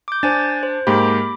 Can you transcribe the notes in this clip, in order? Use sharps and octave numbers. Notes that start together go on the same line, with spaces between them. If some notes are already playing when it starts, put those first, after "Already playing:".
D6 G6
D4 C5 G#5 A6
C5
G#2 A#3 G4 B5 D6